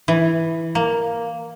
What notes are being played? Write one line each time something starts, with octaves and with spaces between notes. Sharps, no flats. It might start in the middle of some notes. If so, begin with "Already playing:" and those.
E3
A#3